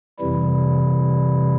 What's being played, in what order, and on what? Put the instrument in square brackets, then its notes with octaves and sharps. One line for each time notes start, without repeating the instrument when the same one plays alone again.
[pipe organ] F2 C3 E3 G3 E4